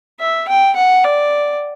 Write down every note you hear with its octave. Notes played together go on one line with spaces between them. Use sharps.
E5
G5
F#5
D5